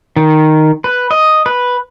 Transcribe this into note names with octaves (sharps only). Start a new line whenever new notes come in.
D#3
B4
D#5
B4